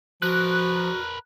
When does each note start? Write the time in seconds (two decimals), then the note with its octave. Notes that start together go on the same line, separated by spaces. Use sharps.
0.22 F3 F#4 A#4 B4 F#6